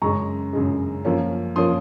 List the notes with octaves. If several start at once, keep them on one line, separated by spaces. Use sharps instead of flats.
F#2 C#3 G#3 A#5 C#6
F#2 C#3 G#3
F#2 F3 A#3 C#4
F3 A#3 C#4 C6 D#6